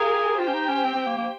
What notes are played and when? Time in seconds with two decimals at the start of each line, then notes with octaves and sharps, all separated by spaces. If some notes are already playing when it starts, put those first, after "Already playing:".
Already playing: G4 G#4 A#4 F5 G#5
0.39 F4 G4 C5 G5
0.48 C#4
0.54 D#4
0.69 C#4
0.84 C4
0.95 C4
1.06 A#3
1.18 A#3